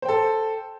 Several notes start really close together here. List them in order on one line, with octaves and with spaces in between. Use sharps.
C5 G5 A4